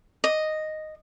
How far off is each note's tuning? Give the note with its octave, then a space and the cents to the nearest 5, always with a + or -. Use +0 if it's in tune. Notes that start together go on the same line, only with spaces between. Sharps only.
D#5 -5